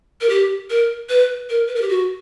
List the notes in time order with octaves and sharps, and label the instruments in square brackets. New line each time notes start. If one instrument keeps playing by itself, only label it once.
[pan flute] A#4
G4
A#4
B4
A#4
B4
A#4
G4
F#4